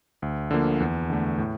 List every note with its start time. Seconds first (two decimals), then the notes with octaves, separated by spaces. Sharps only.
0.22 D2
0.51 D3 F3 A#3
0.80 E2
1.10 D3 A3
1.38 A2